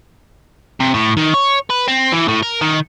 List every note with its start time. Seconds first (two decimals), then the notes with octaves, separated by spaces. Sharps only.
0.80 C3
0.94 A2
1.17 D#3
1.34 C#5
1.70 B4
1.88 C4
2.13 E3
2.28 A2
2.43 A#4
2.61 D#3